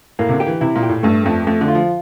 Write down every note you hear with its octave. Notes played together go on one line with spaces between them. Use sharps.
A2 A#3
C3
D3
G4
E3
C3 E4
A#2
G4
A2
G2 A3
F2 A3
F2 A3
D3
F4
F3